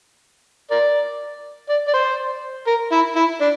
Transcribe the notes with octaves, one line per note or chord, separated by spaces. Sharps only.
A#4 D5
D5
D5
C5
A#4
E4
E4
D4